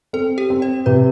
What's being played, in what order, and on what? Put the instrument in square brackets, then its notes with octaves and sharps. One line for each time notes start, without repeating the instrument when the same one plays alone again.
[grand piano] C4 [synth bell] A4
[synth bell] G4
[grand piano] C4
[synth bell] C5
[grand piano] C3 [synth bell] B4